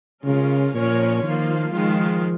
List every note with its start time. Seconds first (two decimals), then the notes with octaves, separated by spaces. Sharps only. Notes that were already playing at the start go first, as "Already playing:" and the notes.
0.24 C#3 G#3 C#4 F4 A#4
0.74 A#2 F3 C#4 A#4 C#5
1.23 D#3 F3 A#3 F4
1.73 D#3 F3 G#3 F4